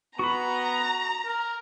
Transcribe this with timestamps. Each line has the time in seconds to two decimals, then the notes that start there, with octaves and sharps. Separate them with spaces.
0.19 B3 F#4 A#5 B5
1.25 A#4